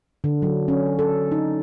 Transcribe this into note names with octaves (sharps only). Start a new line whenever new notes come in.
D3
F#3
C#4
A4
D#4